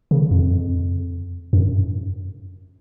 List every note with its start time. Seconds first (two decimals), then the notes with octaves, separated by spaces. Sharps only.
0.11 C#3
0.31 F2
1.53 F#2